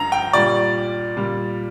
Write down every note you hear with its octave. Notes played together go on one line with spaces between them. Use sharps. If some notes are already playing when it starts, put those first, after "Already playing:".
Already playing: G2 D3 F3 A#5
G5
A#2 G3 D5
A#2 G3